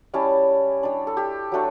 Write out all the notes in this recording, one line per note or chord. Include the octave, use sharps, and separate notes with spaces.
G3 C#4 E4 A5
G3 D4
A4
G4
F#3 A3 D4